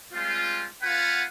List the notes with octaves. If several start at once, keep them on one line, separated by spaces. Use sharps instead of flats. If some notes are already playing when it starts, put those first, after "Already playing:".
G3 G#3 C4 F4
B3 F4 B4 F5 F#5 G#5